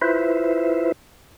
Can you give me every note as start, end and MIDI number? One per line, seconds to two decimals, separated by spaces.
0.01 0.92 64
0.01 0.92 65
0.01 0.92 71
0.01 0.92 72
0.01 0.92 76